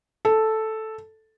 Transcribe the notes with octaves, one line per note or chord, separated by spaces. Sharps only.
A4